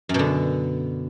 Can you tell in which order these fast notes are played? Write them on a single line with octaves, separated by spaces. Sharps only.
F#2 B2 D3